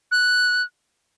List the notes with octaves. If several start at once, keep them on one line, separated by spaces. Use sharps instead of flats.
F#6